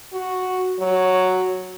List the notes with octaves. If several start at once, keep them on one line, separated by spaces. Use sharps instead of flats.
F#4
F#3